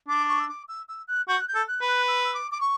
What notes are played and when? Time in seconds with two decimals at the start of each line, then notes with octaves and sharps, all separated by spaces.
0.08 D4 D6
0.29 C#6
0.39 E6
0.49 D6
0.68 E6
0.88 E6
1.08 F#6
1.28 F#4 G6
1.40 F#6
1.48 G6
1.54 A4
1.68 F#6
1.81 B4
1.88 F#6
2.08 E6
2.24 E6
2.34 D6
2.51 D6
2.61 C#6